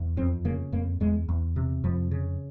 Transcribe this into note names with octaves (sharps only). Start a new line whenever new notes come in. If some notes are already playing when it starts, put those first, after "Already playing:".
Already playing: E2
F2 C4
C#3 A#3
F2 A#3
E2 G#3
E2
C3
F2 F3
C#3